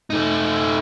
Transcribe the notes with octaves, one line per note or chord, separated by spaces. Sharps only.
A3 D#4